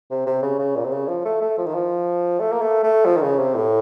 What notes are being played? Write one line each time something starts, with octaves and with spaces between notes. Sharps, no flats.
C3
C3
C#3
C#3
A#2
C3
C#3
F3
A3
A3
F3
D#3
F3
A3
A#3
A3
A3
F3
D#3
C#3
C3
A2